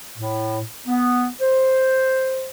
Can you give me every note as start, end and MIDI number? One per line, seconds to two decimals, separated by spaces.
0.17 0.59 45
0.86 1.26 59
1.41 2.50 72